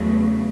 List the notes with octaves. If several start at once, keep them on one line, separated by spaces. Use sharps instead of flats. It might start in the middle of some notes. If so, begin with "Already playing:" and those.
Already playing: E2 C#3 F#3 A3